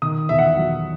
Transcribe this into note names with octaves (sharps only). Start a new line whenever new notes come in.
D#3 D#6
E2 E5
F#5
E5
F#3